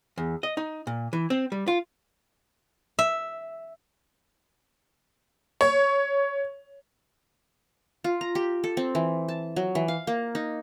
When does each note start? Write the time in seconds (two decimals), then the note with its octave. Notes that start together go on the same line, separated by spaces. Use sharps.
0.18 E2
0.43 D#5
0.57 D#4
0.87 A#2
1.13 E3
1.30 C4
1.52 G3
1.68 F4
2.99 E5
5.61 C#5
8.04 F4
8.21 A#5
8.35 G4
8.64 A4
8.77 C4
8.95 E3
9.29 A5
9.56 F#3
9.75 E3
9.88 F5
10.07 A#3
10.35 D#4